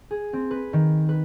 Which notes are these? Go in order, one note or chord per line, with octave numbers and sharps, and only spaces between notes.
G#4
C4
B4
D#3
B4